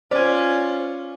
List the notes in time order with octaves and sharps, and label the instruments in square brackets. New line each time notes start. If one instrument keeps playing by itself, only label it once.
[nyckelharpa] C#4 F4 [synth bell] C5 [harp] D5 G#5